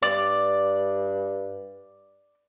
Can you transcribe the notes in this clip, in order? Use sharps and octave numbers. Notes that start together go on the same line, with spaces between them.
G2 D5